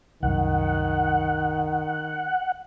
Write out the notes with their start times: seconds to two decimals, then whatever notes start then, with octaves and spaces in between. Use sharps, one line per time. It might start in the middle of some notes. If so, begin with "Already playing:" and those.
0.23 C2 F#2 D#3 F#5